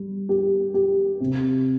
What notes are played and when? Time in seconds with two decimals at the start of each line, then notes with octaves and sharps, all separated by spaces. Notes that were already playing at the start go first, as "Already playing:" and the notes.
Already playing: G3
0.29 G4
0.74 G4
1.20 C3